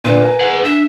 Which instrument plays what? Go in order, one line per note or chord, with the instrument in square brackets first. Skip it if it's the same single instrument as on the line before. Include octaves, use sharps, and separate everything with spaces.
[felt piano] A#2 D3 D4 [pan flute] B4
[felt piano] A#4 G#5
[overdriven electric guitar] G#4 F#5
[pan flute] D4 [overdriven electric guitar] E5